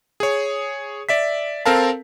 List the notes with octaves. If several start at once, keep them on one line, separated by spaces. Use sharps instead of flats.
G#4 C#5
D5 E5 B6
C4 A4 A#4 F5 A5